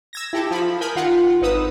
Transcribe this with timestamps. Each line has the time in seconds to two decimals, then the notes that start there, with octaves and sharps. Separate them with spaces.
0.13 E6 G#6 A#6
0.33 E4 G4 A4
0.51 F3 B5
0.81 A#4 G#5 B5 D#6 G6
0.96 D#3 F4 F#5
1.42 G#1 D#4 B4 D#6 E6